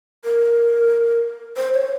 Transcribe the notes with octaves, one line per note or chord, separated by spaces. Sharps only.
A#4
C5
C#5